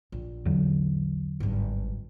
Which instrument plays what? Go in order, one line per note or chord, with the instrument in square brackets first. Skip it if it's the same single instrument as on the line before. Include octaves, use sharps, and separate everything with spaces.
[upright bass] A#1
[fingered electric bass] E2 D3 F#3
[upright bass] G#1 G2